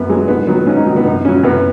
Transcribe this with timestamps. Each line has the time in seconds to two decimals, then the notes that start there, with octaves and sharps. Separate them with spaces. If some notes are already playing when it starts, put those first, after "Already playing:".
Already playing: F#2 B3
0.10 F#3 G#3
0.28 G#2 B3
0.47 D#3 F#3 B3
0.66 G#2 C#4
0.76 D#4
0.86 D#3 F#3
0.96 B3
1.05 F#2 D#4
1.25 C#3 F#3 C#4
1.43 F#2 B3